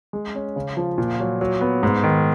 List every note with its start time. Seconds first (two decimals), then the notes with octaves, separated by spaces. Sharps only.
0.13 G#3
0.35 C#4
0.56 C#3
0.77 F3
0.98 A#2
1.20 F#3
1.41 F#3
1.61 B3
1.83 G#2
2.03 D#3